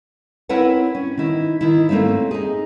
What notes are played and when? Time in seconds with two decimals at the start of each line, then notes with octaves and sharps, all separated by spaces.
0.49 C4 E4 A#4 B4 C#5 F#5
0.95 C#4
1.17 D#3 E4
1.61 D#3 E4
1.89 A3 A#3 C4 C#4 E5
2.31 D#4 G#4